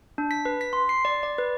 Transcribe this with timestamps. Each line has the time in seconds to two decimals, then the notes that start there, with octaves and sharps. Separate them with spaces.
0.18 D4
0.31 B6
0.45 B4
0.61 B6
0.73 C6
0.89 C7
1.05 D5
1.23 D5
1.38 B4